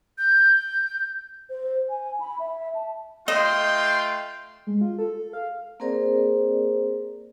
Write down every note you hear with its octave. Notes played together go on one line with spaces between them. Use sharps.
G6
C5
G#5
B5
E5
A5
A3 F4 D#5 G5 C6
G#3
F4
A4
F5
A#3 C4 G#4 A#4 C5 D5